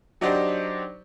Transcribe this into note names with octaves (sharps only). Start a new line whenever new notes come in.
F#3 D4 D#4 G4 C5 D5